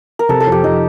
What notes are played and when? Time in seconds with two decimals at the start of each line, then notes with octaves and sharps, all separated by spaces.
0.19 A#4
0.29 C3 A4
0.40 A4
0.47 F2
0.52 G4
0.64 F2 D#4